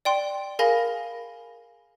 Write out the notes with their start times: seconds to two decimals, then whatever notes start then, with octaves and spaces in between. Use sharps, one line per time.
0.05 D5 G5 C6
0.59 G#4 A#4 F5 G#5 B5 A#6